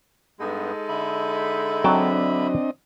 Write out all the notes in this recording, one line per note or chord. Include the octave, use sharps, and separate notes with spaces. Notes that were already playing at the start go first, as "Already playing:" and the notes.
G2 G#3 B3 D#4 A4
D3 E5 B5
F#3 C4 D4 D#5 G5 A5